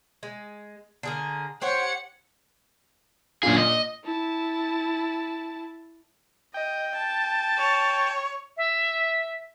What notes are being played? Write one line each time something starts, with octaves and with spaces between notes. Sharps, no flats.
G#3
D3 G#4 A#4
G4 C5 C#5 F#5 C#7
F#2 A#2 D4 F4 G#4
D#5
E4 A5
D#5 G5
A5
C#5
E5